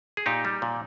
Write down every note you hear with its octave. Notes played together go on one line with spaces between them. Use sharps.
G#4
A#2 D#4 G4
G3
A#2